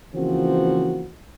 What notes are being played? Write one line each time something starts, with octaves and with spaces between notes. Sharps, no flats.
C#3 E3 F3 A#3 C4 F#4